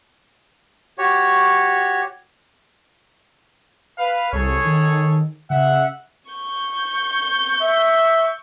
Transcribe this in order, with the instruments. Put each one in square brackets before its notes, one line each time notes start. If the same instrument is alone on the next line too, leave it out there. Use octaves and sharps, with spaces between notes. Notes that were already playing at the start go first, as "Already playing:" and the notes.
[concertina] F#4 G4 C#5
[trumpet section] B4 F5
[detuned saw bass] C2 [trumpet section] G#4 A4 C#5
[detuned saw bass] D#3
[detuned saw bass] C#3 [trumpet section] E5 F#5
[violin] C#6 G6
[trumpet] E5